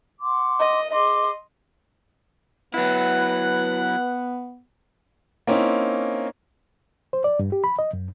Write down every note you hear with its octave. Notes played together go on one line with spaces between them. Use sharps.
F#5 C6 D6
D#5
G#4 D#5 C6 D6
F#3 B3 E4 B4 F#5
A#3 C4 C#4 D#4 E4
C5
D5
G2
G4
B5
D#5
F#2